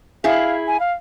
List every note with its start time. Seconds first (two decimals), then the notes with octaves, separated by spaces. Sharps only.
0.24 E4 G#4 F5
0.67 G#5
0.80 F5